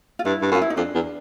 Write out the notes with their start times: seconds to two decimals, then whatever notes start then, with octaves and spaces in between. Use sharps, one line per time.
0.19 F4
0.25 G2 E4
0.42 G2
0.51 F#2
0.55 F4
0.62 E4
0.70 D#4
0.77 F2 D4
0.94 E2